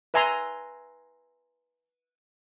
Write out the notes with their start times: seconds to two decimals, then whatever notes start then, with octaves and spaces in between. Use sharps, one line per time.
0.14 B4 E5 G#5 A#5 C6